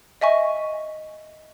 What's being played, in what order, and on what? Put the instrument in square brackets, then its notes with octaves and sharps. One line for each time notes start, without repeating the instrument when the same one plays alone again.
[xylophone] D#5 E5 G#5 C#6